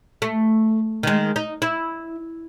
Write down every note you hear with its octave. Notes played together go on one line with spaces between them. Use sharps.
A3
D#3 G#3
D#4
E4